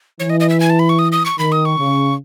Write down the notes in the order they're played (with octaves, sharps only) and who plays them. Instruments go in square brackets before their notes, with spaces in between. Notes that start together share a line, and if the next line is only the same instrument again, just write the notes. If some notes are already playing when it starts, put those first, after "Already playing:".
[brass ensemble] E3 [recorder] C#5
[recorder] D#5
D#5
E5
G#5
A5
B5
C#6
D#6
D#6
C#6
[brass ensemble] D#3 [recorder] B5
[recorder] D#6
C#6
[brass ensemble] C#3